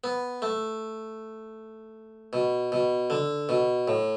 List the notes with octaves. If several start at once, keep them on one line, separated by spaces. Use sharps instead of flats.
B3
A3
B2
B2
D3
B2
A2